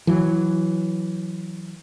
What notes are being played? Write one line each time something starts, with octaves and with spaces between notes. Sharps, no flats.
E3 F#3